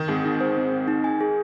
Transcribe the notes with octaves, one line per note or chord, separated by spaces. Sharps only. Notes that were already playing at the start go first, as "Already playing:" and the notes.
Already playing: D#3
G#2 C4
D#4
C5
C4
C4
D#4
G#5
G#4